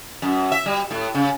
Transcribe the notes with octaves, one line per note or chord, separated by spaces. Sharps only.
F#2
E5
G3
A2
C#3